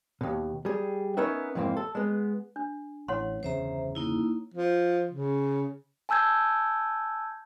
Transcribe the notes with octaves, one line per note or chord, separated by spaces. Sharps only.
D#2 B2
G3 G#4
B3 C#4 D#4 A#4 B4 E5
F2 G#2 E3 A#3 C4
A4
G#3 B3
D4
A1 E3 C#5 F#5 C6
G1 E2 C#3 C5 E5 A#5
A#3 D#4 E4
F3
C#3
G#5 A5 E6 G6 G#6